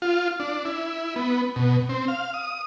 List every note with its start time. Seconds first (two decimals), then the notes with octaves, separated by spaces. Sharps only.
0.02 F4
0.40 D4
0.65 E4
1.16 B3
1.56 B2
1.89 C4
2.08 F5
2.34 D#6